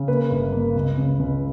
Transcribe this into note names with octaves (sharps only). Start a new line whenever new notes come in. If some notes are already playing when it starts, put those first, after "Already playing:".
Already playing: C#3
A#3 B4
G1
A#3
C#2
C#3
C#2